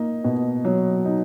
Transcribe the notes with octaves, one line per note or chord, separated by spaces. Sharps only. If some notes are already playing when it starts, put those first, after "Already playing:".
Already playing: A#3 D#4
B2
F#3
D#4